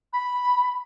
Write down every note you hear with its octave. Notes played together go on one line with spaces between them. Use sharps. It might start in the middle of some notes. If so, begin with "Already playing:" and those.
B5